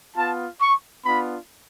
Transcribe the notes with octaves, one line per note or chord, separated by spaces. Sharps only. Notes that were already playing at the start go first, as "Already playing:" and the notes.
B3 F4 A5
C#6
B3 D4 F4 B5